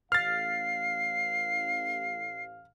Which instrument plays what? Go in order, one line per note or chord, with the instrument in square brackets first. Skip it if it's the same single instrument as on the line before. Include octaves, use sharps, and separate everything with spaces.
[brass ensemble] A1 F5 [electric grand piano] F6 A6 [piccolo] C7